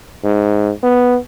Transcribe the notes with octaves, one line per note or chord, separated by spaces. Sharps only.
G#2
B3